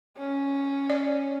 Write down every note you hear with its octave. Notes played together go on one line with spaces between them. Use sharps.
C#4
D5